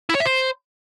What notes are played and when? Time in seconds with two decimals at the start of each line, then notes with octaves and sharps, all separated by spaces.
0.09 E4
0.15 C#5
0.20 E5
0.26 C5